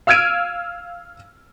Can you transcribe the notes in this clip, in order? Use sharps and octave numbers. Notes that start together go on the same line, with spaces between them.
F5 E6 F6 G#6 D7 D#7